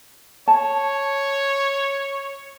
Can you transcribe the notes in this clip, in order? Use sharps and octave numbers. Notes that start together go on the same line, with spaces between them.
C#5 A5